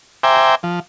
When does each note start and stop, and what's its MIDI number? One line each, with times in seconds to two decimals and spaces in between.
0.23 0.55 72
0.23 0.55 76
0.23 0.55 79
0.23 0.55 80
0.23 0.55 82
0.23 0.55 86
0.63 0.80 53